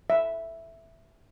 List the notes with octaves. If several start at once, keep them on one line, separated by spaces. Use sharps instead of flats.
E5